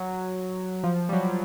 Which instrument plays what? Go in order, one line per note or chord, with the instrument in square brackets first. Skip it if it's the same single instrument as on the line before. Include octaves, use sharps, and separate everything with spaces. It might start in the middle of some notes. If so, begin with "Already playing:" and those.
Already playing: [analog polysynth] F#3
F3
G3
F#3